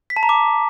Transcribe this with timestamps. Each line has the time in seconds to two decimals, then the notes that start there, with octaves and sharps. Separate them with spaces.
0.10 B6
0.16 A5
0.23 A#5
0.29 D6